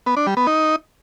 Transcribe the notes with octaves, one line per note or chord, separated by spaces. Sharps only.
B3
D4
G3
B3
D#4